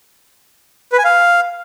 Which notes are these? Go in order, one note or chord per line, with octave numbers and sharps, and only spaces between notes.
B4
G#5
F5